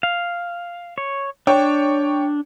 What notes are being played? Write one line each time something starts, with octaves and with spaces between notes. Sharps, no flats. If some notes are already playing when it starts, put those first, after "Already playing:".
F5
C#5
D4 C#5 G5